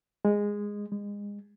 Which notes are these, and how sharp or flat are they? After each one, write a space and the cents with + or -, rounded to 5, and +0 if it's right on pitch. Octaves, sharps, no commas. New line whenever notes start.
G#3 -10
G#3 -25